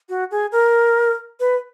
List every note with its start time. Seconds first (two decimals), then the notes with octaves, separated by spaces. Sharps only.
0.09 F#4
0.31 G#4
0.52 A#4
1.40 B4